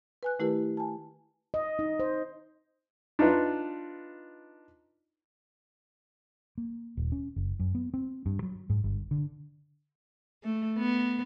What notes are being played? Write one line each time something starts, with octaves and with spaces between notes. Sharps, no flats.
B4 G#5 F#6
D#3 A3 E4 G4 A#4 B4
G#5 A5
D#5
D#4
C5
D4 D#4 F4 B4
A#3
D#1
C#4
F#1
F#2
B3
C4
G2
F#3
G#2
G1
D3
A3
B3